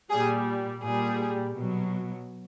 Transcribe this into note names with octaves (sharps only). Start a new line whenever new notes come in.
A#2 G3 G#4
A#2 G3 G#4
B2 F#3